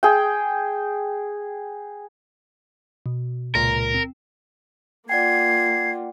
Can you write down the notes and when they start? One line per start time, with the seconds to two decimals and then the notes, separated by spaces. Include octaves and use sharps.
0.03 G#4 G5
3.06 B2
3.55 C#2 A#2 A#4
3.94 C4
5.09 A#3 F4 D5 F#5 G5 G#6 C7